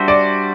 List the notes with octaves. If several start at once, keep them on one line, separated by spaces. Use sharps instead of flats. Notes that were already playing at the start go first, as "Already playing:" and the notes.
Already playing: G3 D4 F#4 C5 E5
D5